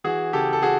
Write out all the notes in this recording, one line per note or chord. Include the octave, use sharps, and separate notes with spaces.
E3 F#4 G#4
C#3 G4 A4
A4
F#4 G#4